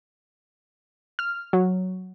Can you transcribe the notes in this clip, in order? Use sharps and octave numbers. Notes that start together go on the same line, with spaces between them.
F6
F#3